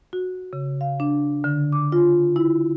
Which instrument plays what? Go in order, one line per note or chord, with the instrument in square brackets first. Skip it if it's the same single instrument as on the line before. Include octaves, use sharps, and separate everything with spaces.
[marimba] F#4
C#3
F5
D4
D3
D6
F4
E4